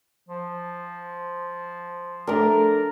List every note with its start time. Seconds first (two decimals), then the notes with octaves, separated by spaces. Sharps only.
0.28 F3
2.27 A3 D4 A#4 D5 A#5